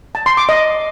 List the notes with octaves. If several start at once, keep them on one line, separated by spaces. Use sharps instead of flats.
A5
C6
D6
D#5